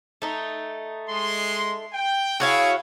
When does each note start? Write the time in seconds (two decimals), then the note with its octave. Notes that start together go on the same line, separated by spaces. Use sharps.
0.22 A3 D#4
1.09 G#3 C6
1.93 G5
2.40 E4 F#4 G#4 C#5 F5